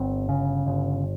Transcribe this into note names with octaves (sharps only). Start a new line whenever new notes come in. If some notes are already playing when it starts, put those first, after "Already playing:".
Already playing: G1 C4
C#3
G1